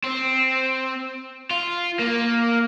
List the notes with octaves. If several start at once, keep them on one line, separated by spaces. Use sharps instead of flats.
C4
F4
A#3